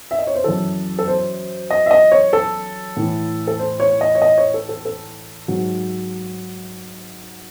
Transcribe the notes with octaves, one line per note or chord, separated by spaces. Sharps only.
E5
D#5
C#5
C5
F#2 E3 A4
A4
C5
D#5
E5
D#5
C#5
A4
A2 E3
A4
C5
C#5
D#5
C#5
D#5
C#5
A4
A4
A4
G#2 F#3